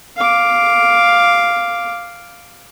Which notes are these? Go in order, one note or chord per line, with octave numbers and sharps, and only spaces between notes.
F5 D6